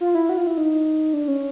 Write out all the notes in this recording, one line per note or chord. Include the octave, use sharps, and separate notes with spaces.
F4
E4
F#4
F4
E4
D#4
D4
C#4